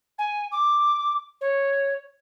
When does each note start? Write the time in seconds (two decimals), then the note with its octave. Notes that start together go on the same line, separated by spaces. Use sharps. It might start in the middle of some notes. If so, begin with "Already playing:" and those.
0.18 G#5
0.52 D6
1.41 C#5